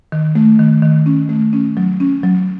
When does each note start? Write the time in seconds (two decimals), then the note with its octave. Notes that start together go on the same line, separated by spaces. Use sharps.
0.12 D#3
0.35 A3
0.59 D#3
0.82 D#3
1.06 C#4
1.29 A3
1.53 C#4
1.77 F#3
2.00 C#4
2.24 F#3